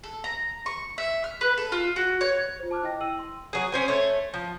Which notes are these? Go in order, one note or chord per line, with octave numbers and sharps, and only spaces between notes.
A4
A#5
C#6
E5
F6
B4
A4
F4
F#4
C#5
F4 C5
A5 D6 F6 F#6
E4 D#5 G5 A#6
G5 E6 D#7 F#7
C6
F#3 G#4
C#4 C5 G#5
A3 C#5
F3